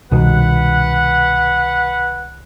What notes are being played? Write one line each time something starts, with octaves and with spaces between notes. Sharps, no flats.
C2 B2 D#3 B4 F#5